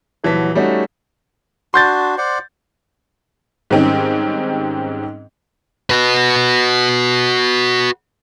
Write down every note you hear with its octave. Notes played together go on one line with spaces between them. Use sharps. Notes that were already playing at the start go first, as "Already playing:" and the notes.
D#1 E3 F#3 A5 B6
G3 A3 C#4 D#4 F#4
D4 F#4 C6 G6 A6
C5 D5 F#5
G#2 D#3 G3 C4 C#4 D#4
F#4 B4